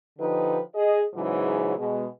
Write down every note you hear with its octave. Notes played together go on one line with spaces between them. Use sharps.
D3 F3 D#4 G4 B4
G#4 D#5
G#2 C#3 E3 F#3
B2 G#3